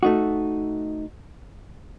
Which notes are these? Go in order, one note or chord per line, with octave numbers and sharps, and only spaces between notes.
A3 D#4 F#4